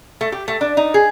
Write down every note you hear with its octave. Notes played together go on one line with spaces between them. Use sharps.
A3
G4
A3
D4
D#4
G#4